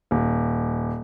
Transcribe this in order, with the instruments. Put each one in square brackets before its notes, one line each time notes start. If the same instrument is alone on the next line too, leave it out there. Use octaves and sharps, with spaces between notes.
[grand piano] D#1